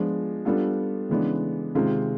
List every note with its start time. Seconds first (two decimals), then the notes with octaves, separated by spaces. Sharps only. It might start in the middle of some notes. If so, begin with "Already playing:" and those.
Already playing: F3 G#3 B3 D4
0.45 G3 B3 D4 F4 A4
1.09 C#3 E3 G#3 B3 D4
1.75 C3 D#3 G#3 C4 F4